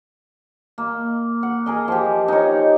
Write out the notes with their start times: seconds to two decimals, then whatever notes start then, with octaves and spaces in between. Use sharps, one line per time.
0.78 A#3
1.43 F#5
1.66 G#4 A#4 D#5
1.88 F3 G4
2.28 D#4 C#5